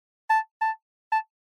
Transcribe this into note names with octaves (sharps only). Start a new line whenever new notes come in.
A5
A5
A5